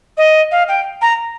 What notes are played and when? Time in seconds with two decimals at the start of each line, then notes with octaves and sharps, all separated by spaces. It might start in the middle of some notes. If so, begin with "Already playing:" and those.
0.18 D#5
0.52 F5
0.68 G5
1.02 A#5